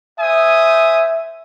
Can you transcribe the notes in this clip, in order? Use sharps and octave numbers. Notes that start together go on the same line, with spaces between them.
C5 E5 G#5 D#6